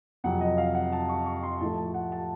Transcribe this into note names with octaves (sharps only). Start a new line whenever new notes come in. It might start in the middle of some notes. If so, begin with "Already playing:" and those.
F2 C3 F#3 F#5
D#5
F5
F#5
A5
C#6
C#6
C6
A2 F3 A3 A5
A5
F#5
A5